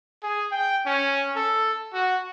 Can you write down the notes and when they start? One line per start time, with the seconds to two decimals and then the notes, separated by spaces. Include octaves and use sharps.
0.23 G#4
0.52 G5
0.86 C#4
1.36 A4
1.93 F#4